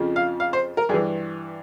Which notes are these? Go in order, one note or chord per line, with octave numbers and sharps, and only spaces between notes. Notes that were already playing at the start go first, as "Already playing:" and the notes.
Already playing: F2 C#3 F3
F5
F5
C5
A#4
G2 E3 G#4